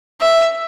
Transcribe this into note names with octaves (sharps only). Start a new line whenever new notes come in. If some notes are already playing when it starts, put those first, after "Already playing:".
E5